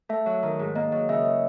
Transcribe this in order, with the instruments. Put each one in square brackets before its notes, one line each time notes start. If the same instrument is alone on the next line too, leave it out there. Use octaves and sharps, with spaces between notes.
[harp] A3 [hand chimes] E5
[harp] F#3
D#3
G#2
[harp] A#3 [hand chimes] D#5
[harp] F#3 [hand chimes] D#5
[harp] C#3 [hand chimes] E5
[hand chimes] D#5